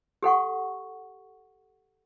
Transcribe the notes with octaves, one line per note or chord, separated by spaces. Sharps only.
G4 A4 F#5 C#6